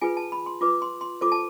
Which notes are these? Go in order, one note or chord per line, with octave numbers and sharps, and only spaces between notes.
F4 G#4 B4 G#5
A5
B5
C6
F4 B4 D6
C6
C6
F4 A4 C5 D6
A5